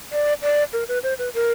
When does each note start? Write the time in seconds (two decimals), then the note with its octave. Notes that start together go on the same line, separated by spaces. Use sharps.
0.12 D5
0.42 D5
0.73 A#4
0.88 B4
1.03 C5
1.19 B4
1.34 A#4